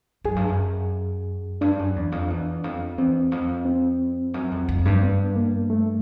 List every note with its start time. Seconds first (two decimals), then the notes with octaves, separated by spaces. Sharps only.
0.24 F#2 G#4
0.36 G2
0.48 F#2
1.61 G2 D4
1.79 F#2
1.96 E2
2.12 F2
2.30 E2
2.64 F2
2.98 E2 C4
3.32 F2
3.65 C4
4.34 F#2
4.51 F2
4.68 F2
4.85 G2
5.03 B3
5.36 A#3
5.70 A3